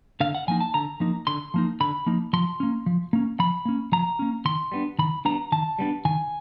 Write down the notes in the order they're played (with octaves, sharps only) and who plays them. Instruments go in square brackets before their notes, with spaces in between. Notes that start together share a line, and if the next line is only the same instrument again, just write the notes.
[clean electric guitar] D3 F5
F#5
F3 A#3 D#4 G#5
A5
D3 A#5
F3 A#3 D#4
D3 C6
F3 A#3 D#4
D3 B5
F3 A#3 D#4
F3 C6
A#3 C#4
F3
A#3 C#4
F3 B5
A#3 C#4
F3 A#5
A#3 C#4
D#3 C6
G3 B3 D4
D#3 B5
G3 B3 D4 A#5
D#3 A5
G3 B3 D4
D#3 G#5